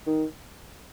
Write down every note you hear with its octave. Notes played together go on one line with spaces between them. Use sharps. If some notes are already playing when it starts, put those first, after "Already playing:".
D#3